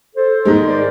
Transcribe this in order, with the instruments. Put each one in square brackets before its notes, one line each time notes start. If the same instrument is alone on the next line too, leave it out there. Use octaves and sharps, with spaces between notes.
[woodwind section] A4 C5
[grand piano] G#2 D#3 G#3
[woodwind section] A#4 C5 D5